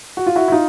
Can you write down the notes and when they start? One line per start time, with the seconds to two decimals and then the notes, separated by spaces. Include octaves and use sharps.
0.17 F#4
0.26 F4
0.36 E4 F#4
0.48 E4
0.52 D#4 F4